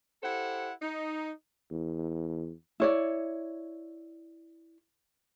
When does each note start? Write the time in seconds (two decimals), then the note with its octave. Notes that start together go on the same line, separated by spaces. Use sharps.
0.23 E4 G4 A4 C5 F#5
0.82 D#4
1.71 E2
2.80 E4 C#5 D5